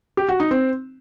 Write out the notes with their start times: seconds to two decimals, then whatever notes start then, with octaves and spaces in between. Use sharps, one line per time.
0.17 G4
0.29 F#4
0.40 D#4
0.51 C4